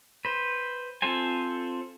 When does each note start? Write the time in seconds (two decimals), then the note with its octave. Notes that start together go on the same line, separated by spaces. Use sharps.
0.25 B4 C5
1.02 C4 F4 A4 C5 G#5